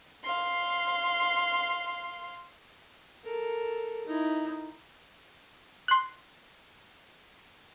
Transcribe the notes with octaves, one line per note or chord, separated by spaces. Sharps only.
F5 C6
A4 A#4
D#4 E4
C6 F#6